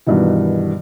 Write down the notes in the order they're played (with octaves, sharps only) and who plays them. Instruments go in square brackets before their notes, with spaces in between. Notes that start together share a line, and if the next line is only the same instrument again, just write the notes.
[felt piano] G2 B2 D#3 E3